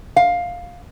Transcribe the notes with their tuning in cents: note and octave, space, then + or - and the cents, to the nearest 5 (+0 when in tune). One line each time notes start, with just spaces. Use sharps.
F5 +10